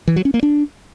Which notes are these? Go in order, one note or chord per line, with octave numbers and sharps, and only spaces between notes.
E3
F#3
C#4
A#3
D4